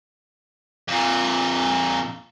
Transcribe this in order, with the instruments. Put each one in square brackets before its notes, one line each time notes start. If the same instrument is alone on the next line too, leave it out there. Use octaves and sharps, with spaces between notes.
[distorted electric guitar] F2 A#2